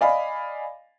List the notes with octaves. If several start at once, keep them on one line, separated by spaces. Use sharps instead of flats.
D5 D#5 F5 G#5 B5